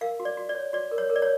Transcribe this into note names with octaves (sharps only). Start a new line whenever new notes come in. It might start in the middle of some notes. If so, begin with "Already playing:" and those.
A#4 F5
F#4
D5
F#4
D5
C#5
F#4 D5
A#4
C#5
A#4
D5
C#5